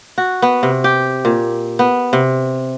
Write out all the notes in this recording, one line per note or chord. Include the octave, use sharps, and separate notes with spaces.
F#4
B3
C3
G4
A#2
B3
C3